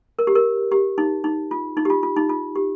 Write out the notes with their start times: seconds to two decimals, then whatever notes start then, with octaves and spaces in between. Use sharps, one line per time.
0.19 A#4
0.27 G4
0.35 A#4
0.72 G4
0.98 D#4
1.24 D#4
1.51 F4
1.77 D#4
1.85 G4
1.90 F4
2.03 F4
2.16 D#4
2.29 F4
2.55 G4